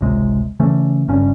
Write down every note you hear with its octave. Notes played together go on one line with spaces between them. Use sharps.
G#1 C#2 C3 G#3
C#3 E3 A3 C#4
F#1 G2 C#3 C#4